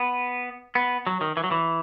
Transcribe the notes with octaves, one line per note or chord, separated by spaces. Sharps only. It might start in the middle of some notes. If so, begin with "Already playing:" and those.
Already playing: B3
B3
F#3
D#3
E3
F#3
E3